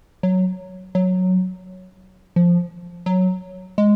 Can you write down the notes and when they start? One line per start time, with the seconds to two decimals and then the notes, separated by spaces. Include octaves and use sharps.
0.23 F#3
0.95 F#3
2.36 F3
3.06 F#3
3.78 G#3